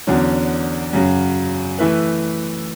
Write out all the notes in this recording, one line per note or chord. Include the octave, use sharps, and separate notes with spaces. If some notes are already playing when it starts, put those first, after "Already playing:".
E2 D3 F#3 C#4
F#2 C#3 F#3
E3 A3 E4 B4